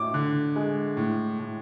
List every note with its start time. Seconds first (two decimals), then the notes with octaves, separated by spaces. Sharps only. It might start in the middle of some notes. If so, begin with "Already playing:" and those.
Already playing: A2 D6
0.14 D3
0.56 G#3
0.97 A2
1.39 A2